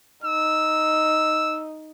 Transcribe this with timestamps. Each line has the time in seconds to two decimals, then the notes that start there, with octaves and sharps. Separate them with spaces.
0.24 D#4 E6